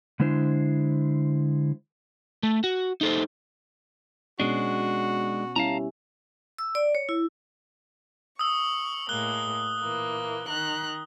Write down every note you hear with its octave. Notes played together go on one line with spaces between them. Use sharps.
D3 G#3 D4 E4 C5
A3
F#4
D#4 A4 C5
B2 G#3 B3 C#4 D4 F#4
G3 C#4 E4 F5 A5 A#5
E6
D5
C#5
E4
C#6 D#6 E6
A2 G#3 A#3 F#6 G7
A#2 E3 A#3
D#3 A#5 F#6